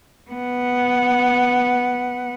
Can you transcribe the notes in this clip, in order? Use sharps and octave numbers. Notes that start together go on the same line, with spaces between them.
B3 F#5